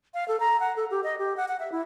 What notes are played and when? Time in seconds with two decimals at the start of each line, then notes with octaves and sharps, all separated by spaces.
0.14 F5
0.28 A4
0.40 A#5
0.60 F#5
0.76 A4
0.91 G4
1.04 D#5
1.18 G4
1.37 F#5
1.48 F#5
1.59 E5
1.72 E4